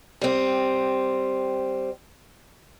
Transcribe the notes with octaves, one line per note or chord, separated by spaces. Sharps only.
G3 C4